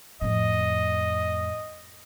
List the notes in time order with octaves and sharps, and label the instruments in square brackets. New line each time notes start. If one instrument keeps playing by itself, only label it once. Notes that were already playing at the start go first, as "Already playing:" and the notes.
[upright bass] F2 A2 [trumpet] D#5